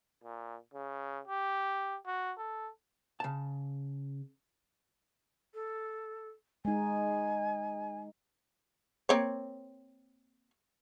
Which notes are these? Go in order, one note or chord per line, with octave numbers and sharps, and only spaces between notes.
A#2
C#3
G4
F#4
A4
C#3 A5
A4
G#3 D#4 G#5
A#3 C4 C#5